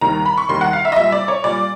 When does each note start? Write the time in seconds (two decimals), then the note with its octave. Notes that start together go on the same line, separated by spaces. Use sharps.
0.01 D#2 D#3 G3 A#5
0.26 B5
0.38 C#6
0.49 D#2 D#3 G3 C6
0.61 F#5
0.73 F5
0.85 E5
0.92 D#5
0.96 A#2 G3 E5
1.12 D5
1.28 C#5
1.44 A#2 G3 D5